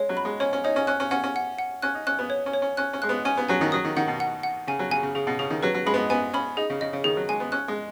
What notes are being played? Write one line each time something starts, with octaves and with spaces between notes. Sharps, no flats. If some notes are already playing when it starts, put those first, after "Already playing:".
Already playing: G#3 C#5
F#3
B5
G#3
C#4 C#5
C#4
D#4 C#5
C#4
C#4 F#6
C#4
C#4 F#5
C#4
F#5
F#5
C#4 F#6
D#4
C#4 F#6
B3
C#5
C#4
C#5
C#4
C#4 F#6
C#4
G#3 F#6
B3
C#4 G#5
B3
F#3 G#5
D#3
F#3 D#6
D#3
D#3 F#5
B2
F#5
F#5
C#3 G#5
F#3
C#3 G#5
C#3
C#3 G#4
B2
C#3 G#4
D#3
F#3 B4
F#3
G#3 B5
B3
G#3
B3 G#5
C#4 B5
D#4 G#4
C#3
C#3 D#5
C#3
D#3 G#4
F#3
G#3 G#5
B3
C#4 F#6
G#3